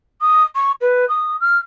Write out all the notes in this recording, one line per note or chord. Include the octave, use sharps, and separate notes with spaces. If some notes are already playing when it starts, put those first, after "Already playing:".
D#6
C#6
B4
D#6
F6